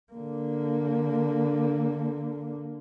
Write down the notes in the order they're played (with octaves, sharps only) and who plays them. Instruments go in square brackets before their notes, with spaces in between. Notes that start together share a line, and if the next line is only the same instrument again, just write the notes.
[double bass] D3 A#3